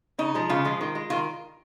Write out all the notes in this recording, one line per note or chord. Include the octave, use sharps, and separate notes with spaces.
C#3 D#4
F3 G#3
C#3 F4
F3 G#3
D#3
G#3
D#3 F4